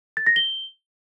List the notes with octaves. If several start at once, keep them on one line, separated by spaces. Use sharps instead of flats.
A6
A#6
G7